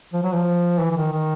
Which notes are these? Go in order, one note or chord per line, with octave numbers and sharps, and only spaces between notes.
F3
F#3
F3
E3
E3
D#3
D#3